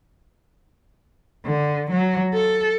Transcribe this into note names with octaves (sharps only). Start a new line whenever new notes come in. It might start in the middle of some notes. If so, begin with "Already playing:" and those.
D3
F#3
A4